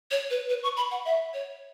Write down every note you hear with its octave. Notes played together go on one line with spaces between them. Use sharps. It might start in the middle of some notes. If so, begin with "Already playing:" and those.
C#5
B4
B4
C#6
B5
F#5
E5
C#5